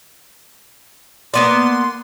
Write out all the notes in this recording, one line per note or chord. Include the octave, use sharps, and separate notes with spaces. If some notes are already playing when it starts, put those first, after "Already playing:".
A#3 B3 D5 C6